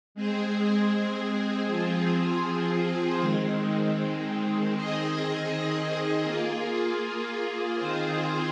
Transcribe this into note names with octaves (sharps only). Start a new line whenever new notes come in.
G#3 C4 G#4
F3 C4 F4 G#4
D#3 G#3 C4
D#3 C4 G#4 D#5
A#3 F4 G#4
D#3 C4 F4 G#4 C5